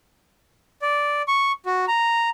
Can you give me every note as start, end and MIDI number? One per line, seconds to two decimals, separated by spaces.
0.82 1.22 74
1.28 1.52 85
1.66 1.85 66
1.88 2.30 82